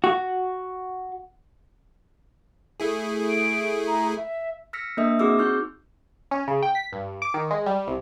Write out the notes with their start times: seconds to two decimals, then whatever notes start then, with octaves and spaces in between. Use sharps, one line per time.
0.04 F#4
2.80 A3 E4 G#4
3.29 D7
3.87 A#5
4.17 E5
4.73 E6 F6 A#6 B6 C#7
4.97 A#3 D4 A#4 D#5 E5 D#6
5.19 C4 F#4 G#4 D6 E6 F6
5.38 D#4 C#6 F6 G6
6.31 C#4
6.48 C#3
6.63 G5
6.75 B6
6.92 G2
7.22 D6
7.34 D#3
7.51 G#3
7.66 G3
7.88 C2